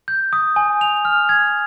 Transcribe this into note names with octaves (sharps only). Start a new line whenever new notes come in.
G6
D#6
G#5
F7
F6
G#6